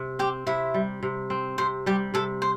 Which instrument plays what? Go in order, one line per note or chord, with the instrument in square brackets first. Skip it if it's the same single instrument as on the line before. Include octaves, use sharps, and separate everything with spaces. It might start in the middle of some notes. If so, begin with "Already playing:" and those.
Already playing: [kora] C3
[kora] C4 [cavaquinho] G4 G5
[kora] C3 [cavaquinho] E4 E5
[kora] G3
C3
C4
[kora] C3 [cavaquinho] C5
[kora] G3 [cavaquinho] G4
[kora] C3 [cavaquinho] A4
[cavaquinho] C5